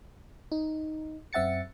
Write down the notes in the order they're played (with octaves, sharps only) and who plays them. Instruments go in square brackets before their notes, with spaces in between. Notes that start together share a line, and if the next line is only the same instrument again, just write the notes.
[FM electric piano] D#4
F#2 C4 E5 F#5 A6 C#7